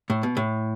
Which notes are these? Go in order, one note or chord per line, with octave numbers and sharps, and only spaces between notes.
A2
B2
A2